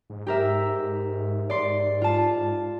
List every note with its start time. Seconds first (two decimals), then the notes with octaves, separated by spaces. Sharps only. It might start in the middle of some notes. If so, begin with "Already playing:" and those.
0.10 G#2
0.27 G4 A#4 E5
1.50 D5 C6
2.02 F4 A5